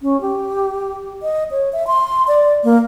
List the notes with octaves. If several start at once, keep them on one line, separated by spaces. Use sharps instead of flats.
C#4
G4
D#5
C#5
E5
C6
D5
A#3